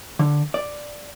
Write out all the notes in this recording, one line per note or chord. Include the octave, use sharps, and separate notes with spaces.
D3
D5